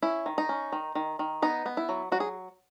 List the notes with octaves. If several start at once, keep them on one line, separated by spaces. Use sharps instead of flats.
C#4 E4
D#3
D#4
C#4
D#3
D#3
D#3
B3 D#4
B3
E4
F#3
F#3 F#4
G#4